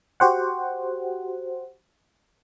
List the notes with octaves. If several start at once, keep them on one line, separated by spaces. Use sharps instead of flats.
F#4 G4 C5 F#5